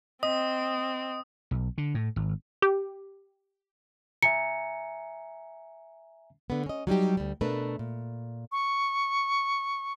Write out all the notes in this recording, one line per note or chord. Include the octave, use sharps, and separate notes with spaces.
C4 D#5 D#6
B1
D3
A2
G#1
G4
E5 G#5 A#5 C#7
D3 B3
C#4 D#5
F#3 G3 D#4 G4
D2 G3
B2 A3 D4 A#4 B4
A#2
C#6